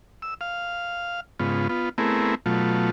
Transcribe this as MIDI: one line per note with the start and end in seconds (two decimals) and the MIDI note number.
0.22 0.34 88
0.41 1.20 77
1.40 1.68 44
1.40 1.68 49
1.40 1.68 59
1.40 1.68 65
1.69 1.89 59
1.69 1.89 65
1.98 2.35 57
1.98 2.35 59
1.98 2.35 60
1.98 2.35 64
1.98 2.35 68
1.98 2.35 70
2.46 2.90 47
2.46 2.90 54
2.46 2.90 57
2.46 2.90 65